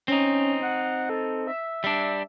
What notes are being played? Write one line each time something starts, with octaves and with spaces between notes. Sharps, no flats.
C4 C#4 D#4
F#5
A4
E5
G3 D4